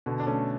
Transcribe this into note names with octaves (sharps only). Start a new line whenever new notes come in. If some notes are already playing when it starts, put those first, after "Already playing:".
B2 D3
D4
A3 C#4